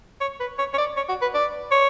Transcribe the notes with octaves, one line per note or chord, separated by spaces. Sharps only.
C#5
B4
C#5
C#5
D5
C#5
F#4
B4
D5
C#5